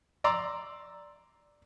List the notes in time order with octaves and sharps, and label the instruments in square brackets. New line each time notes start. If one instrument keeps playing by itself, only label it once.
[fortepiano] D5 A#5 C6 D6 E6